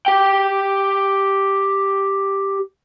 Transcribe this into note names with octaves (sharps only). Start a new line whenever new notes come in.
G4 G5